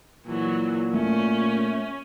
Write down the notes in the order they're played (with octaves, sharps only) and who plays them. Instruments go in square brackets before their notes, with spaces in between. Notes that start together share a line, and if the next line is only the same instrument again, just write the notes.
[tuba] A#2 [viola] E3 F#3
[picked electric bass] A3 [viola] C#4